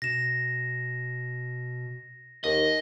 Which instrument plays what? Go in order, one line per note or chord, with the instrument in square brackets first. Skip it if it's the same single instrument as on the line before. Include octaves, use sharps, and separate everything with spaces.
[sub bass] B2 [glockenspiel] A#6 E7
[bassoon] D#2 [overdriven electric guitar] D#5